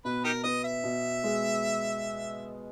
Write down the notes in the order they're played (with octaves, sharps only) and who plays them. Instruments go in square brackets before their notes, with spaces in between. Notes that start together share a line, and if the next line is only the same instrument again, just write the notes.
[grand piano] B2 [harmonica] B4
[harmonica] D#4 G4 A#4
[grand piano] B3 [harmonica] D#5
[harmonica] E5
[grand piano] B2
G#3